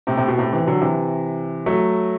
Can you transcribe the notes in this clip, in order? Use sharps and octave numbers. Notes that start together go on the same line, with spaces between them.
A2 C3
A2 C3
B2
A2 C3
C3 E3
D3 F#3
C3 E3
F#3 A3